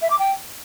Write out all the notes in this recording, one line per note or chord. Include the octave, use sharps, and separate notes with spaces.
E5
D6
G5